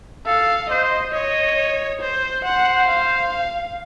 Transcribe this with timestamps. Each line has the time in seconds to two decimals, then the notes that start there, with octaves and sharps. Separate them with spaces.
0.26 A4 F5
0.70 C5 D#5
1.14 C#5 D#5
2.02 C5
2.45 C5 F#5
2.88 F5